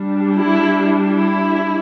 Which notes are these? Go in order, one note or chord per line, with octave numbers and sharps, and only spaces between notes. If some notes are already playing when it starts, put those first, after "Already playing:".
Already playing: G3 D4
E4
E4